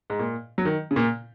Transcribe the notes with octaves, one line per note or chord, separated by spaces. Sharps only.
G#2
A#2
F#3
D#3
C#3
A#2